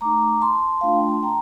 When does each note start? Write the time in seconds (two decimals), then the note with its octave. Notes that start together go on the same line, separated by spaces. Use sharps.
0.01 A3 D#4 A#5 D6
0.41 A5 C6
0.81 A3 D4 F4 F5
0.96 G5
1.09 A5
1.23 G5 A#5